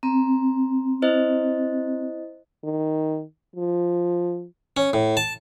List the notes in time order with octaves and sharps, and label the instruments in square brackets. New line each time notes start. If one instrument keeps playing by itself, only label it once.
[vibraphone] C4 [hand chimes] A#5
[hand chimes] E4 C5 D#5
[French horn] D#3
F3
[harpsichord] C#4
A2
A5